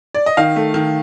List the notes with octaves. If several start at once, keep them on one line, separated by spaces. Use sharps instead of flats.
D5
D#5
D#3 F5
A3
D#3